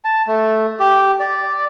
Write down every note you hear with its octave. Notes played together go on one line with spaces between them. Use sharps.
A5
A3
G4
D5